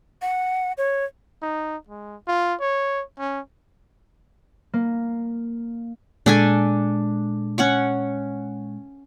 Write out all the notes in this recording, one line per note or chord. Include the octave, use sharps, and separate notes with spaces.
F#5
C#5
D#4
G#3
F4
C#5
C#4
A#3
A#2 G#3 D4 A4 G#5
C#4 F#5 C#6